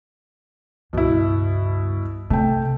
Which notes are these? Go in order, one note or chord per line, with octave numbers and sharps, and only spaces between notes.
C#2 G2 B2 E4
C3 A3 G5